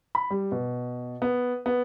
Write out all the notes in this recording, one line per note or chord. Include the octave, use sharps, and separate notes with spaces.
B5
G3
B2
B3
B3